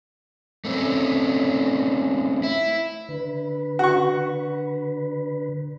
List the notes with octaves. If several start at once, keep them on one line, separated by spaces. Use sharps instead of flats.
A3 C4 C#4
E4
D3 B4
F#4 C#6